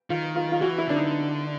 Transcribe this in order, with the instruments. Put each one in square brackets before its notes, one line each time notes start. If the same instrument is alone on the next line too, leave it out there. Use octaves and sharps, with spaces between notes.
[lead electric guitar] D#3 [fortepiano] F4
[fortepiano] F4
F4
[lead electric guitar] E3 [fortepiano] F#4
[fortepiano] E4
[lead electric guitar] D3 [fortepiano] D4
[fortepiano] D#4